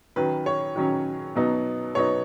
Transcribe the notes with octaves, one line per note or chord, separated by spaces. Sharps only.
D#3 F#3 C#4 B4
C#5
D#3 F#3 C#4
B2 F#3 B3 D#4
B2 F#3 B3 D#4 C#5